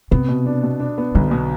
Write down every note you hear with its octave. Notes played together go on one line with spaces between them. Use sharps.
C3 B3
B2
D4
B2
D4
B3
B1 D3
B2